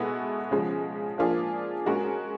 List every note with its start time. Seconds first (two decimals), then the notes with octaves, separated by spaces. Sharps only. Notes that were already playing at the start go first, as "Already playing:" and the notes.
Already playing: B2 G#3 B3 E4 A4
0.51 C#3 F3 G#3
1.18 F3 A#3 D4 F4 G#4
1.86 G#3 C#4 F#4 A#4